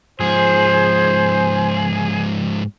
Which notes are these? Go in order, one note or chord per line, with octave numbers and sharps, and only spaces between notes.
G#2 F3 G#4 C5